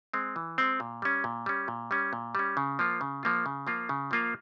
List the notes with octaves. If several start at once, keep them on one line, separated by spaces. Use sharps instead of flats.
G#3 C4
E3
G#3 C4
A#2
G3 C#4
A#2
G3 C#4
A#2
G3 C#4
A#2
G3 C#4
C#3
F3 A#3 F4
C#3
F3 A#3 F4
C#3
F3 A#3 F4
C#3
F3 A#3 F4